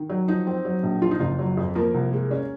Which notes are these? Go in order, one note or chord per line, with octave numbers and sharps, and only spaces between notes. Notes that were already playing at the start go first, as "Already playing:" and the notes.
Already playing: D#3
F#3
F3 D#4
C4
F#3
A#1
F3 F4
D#4
F#1 F4
F#3
F2
F3 A#3 A#4
C2
G#3
C#4